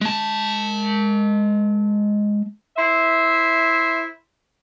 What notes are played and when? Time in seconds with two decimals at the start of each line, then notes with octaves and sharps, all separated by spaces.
0.01 G#3 A5
2.77 E4 C5 E5